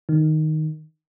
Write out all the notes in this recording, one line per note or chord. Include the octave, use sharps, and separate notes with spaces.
D#3